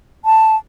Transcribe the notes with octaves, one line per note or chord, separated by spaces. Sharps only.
A5